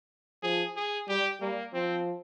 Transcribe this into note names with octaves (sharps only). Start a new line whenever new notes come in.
F3 G#4
G#4
G3 G4
G3 A#3
F3 C4